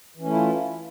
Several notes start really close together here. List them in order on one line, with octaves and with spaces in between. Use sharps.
E3 C#4 A3 E4 F4